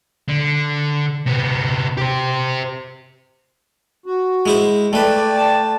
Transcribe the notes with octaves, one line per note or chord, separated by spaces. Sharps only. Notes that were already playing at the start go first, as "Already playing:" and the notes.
D3
C3 B3
G4 C5
F#4
G#3 E4 C5
A3 B4 D5 G5 A5
A5